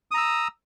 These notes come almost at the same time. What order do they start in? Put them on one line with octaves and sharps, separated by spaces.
D#6 A#5 E6